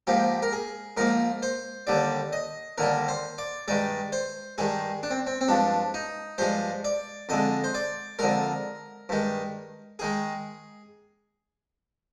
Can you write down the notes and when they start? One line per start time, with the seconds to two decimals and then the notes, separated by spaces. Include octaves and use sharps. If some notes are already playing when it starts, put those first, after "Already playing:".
0.07 G#2 F3 A#3 G4
0.42 A#4
0.53 G#4
0.97 G#2 F3 A#3 A#4
1.42 C5
1.87 D#2 D3 G3 D5
2.33 D#5
2.78 D#2 D3 G3 A#4
3.08 C5
3.38 D5
3.68 G2 D#3 G#3 D5
4.12 C5
4.58 G2 D#3 G#3 G#4
5.03 D4
5.10 C4
5.27 C4
5.41 C4
5.48 G2 F3 G#3 D4
5.94 D#4
6.38 G2 F3 G#3 C5
6.84 D5
7.29 F2 D3 G#3 D#5
7.64 C5
7.75 D5
8.19 F2 D3 G#3 A#4
9.09 G2 D#3 G#3
9.99 D#3 G#3 G#4